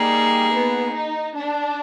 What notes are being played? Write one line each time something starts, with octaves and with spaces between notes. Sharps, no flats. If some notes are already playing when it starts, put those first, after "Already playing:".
Already playing: G3 A#3 D#4 G#4
B3
D#4
D4